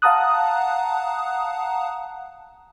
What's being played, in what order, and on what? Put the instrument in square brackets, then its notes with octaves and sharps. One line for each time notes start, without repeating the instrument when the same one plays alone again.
[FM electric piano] F5 F#5 A5 A#5 D#6 F#6